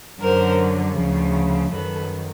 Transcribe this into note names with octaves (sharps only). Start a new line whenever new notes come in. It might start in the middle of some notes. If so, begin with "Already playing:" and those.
F#2 D3 F#3 A#4 C5
D2 C#3 F3
F#2 D#3 F#3 A4 B4